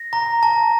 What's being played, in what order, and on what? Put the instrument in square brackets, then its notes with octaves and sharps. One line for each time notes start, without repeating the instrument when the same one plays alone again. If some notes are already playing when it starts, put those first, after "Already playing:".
Already playing: [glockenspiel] A#6
A#5
A5